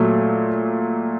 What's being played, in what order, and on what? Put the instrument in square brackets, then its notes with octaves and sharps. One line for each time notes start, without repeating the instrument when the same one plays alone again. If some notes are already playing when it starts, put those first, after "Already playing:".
Already playing: [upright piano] A#2 F#3 A3